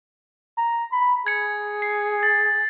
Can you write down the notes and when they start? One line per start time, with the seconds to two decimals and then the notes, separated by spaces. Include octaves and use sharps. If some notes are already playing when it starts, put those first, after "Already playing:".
0.58 A#5
0.92 B5
1.27 G#4 G#6 C#7
1.82 C7
2.23 A6